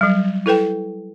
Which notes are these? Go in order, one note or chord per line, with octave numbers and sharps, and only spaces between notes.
F#3 G3
E4 A4 B4 G5